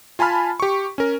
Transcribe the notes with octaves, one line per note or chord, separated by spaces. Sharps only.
F4 G#5 A5 B5 F6
G4 C#6
C#4 A#4